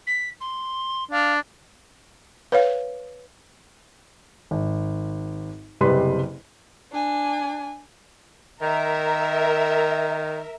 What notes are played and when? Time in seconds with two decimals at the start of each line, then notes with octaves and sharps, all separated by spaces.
0.07 B6
0.40 C6
1.11 D4 F5
2.52 B4 C#5 F5
4.51 G#1
5.81 F#1 C3 G3 B4 D#5 C6
6.92 D4 G#5
8.62 D#3 A#4 E5